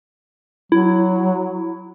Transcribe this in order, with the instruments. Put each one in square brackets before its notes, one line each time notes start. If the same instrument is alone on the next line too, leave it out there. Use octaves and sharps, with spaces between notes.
[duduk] F#3 [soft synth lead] E4